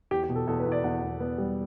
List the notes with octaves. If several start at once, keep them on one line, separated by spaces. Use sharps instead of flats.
E2 G4
G4
B2
A4
E2 A4
B4
E2
D5
E2 F#5
E2
B3
G3